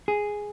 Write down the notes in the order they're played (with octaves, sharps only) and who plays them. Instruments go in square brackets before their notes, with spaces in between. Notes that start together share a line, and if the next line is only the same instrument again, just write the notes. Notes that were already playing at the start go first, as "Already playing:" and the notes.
[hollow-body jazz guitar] G#4